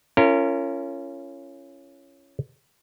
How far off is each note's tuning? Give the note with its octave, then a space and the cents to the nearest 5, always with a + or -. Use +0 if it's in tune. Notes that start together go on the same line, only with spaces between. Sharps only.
C#4 +0 F4 -40 A#4 -30